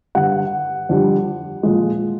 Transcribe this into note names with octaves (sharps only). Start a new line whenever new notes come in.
G2 D3 G3 F#5
F2 D3 G3
A#2 F3 G#3